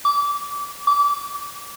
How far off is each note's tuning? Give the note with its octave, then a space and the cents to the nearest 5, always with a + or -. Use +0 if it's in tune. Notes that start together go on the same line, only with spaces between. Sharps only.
D6 -25
D6 -25